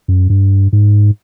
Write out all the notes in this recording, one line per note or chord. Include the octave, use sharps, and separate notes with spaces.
F#2
G2
G#2